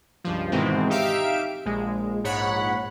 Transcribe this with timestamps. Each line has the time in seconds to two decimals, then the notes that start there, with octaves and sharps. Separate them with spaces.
0.24 C#2 G2 F3
0.52 G#2 B2 D#3 E3 G#3 C4
0.90 D#4 G4 E5 F5 D7
1.66 A#1 G#3
2.24 A#1 G#2 C#5 F#5 B5